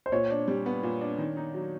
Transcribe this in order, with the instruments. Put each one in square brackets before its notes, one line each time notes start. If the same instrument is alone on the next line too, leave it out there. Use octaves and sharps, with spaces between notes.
[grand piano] C5
[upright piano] A#2 [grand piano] C#5
[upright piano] D4
G3
B3
A#2
D4
D#3
D#4
F#3